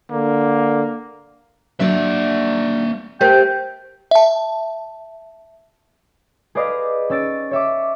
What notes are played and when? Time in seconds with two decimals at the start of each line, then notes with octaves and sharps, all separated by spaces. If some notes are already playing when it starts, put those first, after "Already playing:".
0.11 D3 A#3
1.80 F#3 A#3 D4 D5 E5
3.21 A3 G4 A#4 C5 G5
4.11 E5 A5
6.55 G#4 B4 C5 D5 D#5 F5
7.10 C#4 E6 A6 D7
7.51 C#5 E5 D6